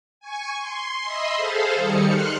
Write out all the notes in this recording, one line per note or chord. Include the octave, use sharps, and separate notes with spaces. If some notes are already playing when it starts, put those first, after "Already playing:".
G#5 C#6
C6
D#5 E5 B5 C6
G#4 A4 C5 F5
D#3 G3 D#4 C#7
C6 F6 F#6